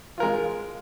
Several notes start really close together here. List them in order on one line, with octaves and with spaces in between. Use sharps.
F4 A#4 G#3